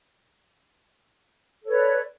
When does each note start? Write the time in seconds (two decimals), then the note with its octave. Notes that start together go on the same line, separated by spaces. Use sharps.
1.63 A4
1.66 C#5
1.69 B4
1.71 D5